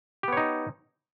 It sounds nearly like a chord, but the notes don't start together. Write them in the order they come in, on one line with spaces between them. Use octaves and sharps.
G4 B3 C#5 D#4